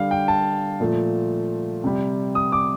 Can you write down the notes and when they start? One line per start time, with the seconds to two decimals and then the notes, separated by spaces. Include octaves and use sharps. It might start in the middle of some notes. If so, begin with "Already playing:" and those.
Already playing: D3 G3 F5
0.11 G5
0.28 A5
0.80 A#2 F3 A3
1.84 C3 G3
2.35 D#6
2.52 D6